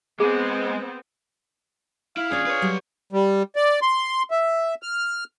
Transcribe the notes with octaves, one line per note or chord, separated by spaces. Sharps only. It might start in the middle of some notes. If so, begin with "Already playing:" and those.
G#3 B3 C4 G#4
E4 F5
D#2 C#4 D4 F4 G#4 D5
B4 C#5
F#3 G3
G3
D5
C6
E5
F6